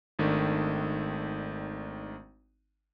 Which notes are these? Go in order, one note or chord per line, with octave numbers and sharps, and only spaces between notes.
G#1 D#3 A3 D4